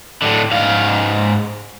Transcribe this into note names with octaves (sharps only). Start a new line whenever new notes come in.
A2 D3
G#2 F5